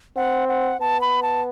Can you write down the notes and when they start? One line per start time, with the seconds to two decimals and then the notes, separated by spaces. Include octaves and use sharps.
0.16 C4 F#5
0.48 F#5
0.80 B3 A5
1.01 B5
1.22 A5